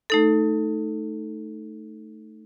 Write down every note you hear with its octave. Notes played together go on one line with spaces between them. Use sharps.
A3 D#4 A4